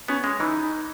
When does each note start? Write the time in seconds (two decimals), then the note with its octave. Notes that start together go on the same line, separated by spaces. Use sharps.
0.08 B3 C#4
0.24 G#3
0.39 E3 D#4